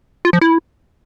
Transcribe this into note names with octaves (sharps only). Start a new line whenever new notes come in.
F4
F3
E4